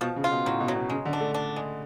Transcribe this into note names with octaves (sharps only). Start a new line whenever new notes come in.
B2 F3
C#3
F4
B2
A2 F#3
B2
F#3
B2
C#3 G#3
D3
D4
A3
D4
G#3